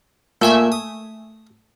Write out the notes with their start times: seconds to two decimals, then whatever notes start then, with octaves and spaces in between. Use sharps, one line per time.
0.42 A#2 A3 E5 G#5
0.72 D#6